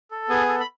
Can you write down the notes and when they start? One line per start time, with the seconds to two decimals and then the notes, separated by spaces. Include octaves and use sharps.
0.11 A4
0.29 B3 G#4 G#5
0.48 A4
0.60 B5